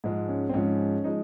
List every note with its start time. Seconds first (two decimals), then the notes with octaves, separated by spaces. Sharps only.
0.04 G#2 F3 G#3
0.28 C#4
0.49 C4
0.54 G#2 F3 G#3 C#4
1.04 F3 G#3 D#4